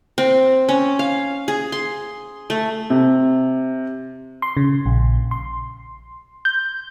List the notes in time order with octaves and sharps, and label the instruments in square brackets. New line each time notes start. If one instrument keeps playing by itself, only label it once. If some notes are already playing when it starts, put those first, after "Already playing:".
[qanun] C4
C#4
F5
G#4
C6
A3
[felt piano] C3
[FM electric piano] C6
C#3
A#1
C6
G6